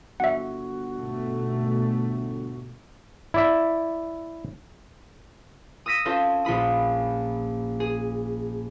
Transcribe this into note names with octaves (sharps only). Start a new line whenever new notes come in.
G1 F#4 E5 F#5
G#2 B2 A3
E4 D5 E5
D#6 E6 A#6 B6 D#7
C4 C#4 F4 A4 C5
A#1 F4 B5 D#6
G#4